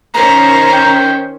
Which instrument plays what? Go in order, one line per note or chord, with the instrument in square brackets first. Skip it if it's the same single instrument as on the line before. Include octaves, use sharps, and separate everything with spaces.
[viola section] D#3 C#4 C5 [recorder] A#5
[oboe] G5